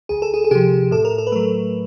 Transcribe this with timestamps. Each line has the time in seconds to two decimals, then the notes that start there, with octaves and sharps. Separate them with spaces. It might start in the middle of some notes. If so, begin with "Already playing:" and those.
0.09 D2 G#4
0.22 A4
0.34 G#4
0.44 G#4
0.51 C3 F3 G4
0.91 A2 A4
1.05 A#4
1.18 A4
1.27 B4
1.32 F#3 A3 A#4